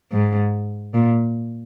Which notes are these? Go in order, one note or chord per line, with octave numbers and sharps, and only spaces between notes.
G#2
A#2